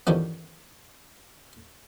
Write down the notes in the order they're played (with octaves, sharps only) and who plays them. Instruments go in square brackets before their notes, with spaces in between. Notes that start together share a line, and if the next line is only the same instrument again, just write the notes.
[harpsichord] E2 G2 D3 D#3 F3 C#4